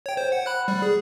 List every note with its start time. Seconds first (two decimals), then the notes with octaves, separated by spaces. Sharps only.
0.06 C#5 G5
0.17 C5
0.32 F#5
0.46 B5 F#6
0.68 G3
0.82 G#4